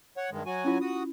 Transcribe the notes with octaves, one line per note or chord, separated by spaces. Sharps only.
C#5 F#5
G2 D#3 G#3
F#3 F#4 G#5
C#4 E4 F4
F#4 D#6